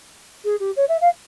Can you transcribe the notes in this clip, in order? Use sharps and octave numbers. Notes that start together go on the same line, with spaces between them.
G#4
G4
C#5
E5
F5